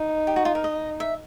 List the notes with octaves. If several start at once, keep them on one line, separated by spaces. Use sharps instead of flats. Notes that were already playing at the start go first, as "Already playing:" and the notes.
Already playing: D#4
G4
F#4
F4
A#4
D#5
E5